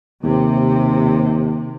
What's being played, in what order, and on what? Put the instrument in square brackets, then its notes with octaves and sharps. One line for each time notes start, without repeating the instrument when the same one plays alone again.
[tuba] D#2 [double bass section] C3